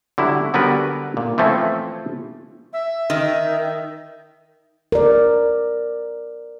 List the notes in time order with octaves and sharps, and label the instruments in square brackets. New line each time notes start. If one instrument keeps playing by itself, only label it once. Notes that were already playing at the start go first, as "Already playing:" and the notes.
[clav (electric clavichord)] D3 F#3 G3 E4
D3 F#3 G3 B3 A#4 B4
A#2
E3 F3 A3 C4 C#4
[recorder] E5
[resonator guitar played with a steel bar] D#3
[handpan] A#4 D5